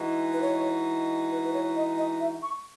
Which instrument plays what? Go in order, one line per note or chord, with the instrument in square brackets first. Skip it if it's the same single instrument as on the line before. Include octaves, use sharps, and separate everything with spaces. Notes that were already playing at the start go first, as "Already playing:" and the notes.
Already playing: [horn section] E3 G#3 D#4 F#4
[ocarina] B4
C#5
B4
B4
C#5
D#5
D#5
E5
C#6